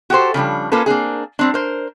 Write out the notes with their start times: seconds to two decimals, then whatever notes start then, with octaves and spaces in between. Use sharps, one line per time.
0.10 F#4 G4 A4 C5
0.34 C#3 F3 G3 D4
0.72 A#3 C#4 F4 A4 B4
0.86 A#3 C4 D4 G#4
1.39 G3 C4 D4
1.54 A#4 C5